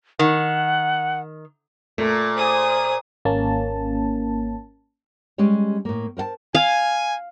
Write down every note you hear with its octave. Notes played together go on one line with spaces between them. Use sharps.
D#3 F#5
A#2 A3
G#4 C5 D#6
G#1 A#3 C#4 A5
G3 G#3 C#4 G4 C#5
A2 A#3
A#4 C5 F5 A5
F5 G#5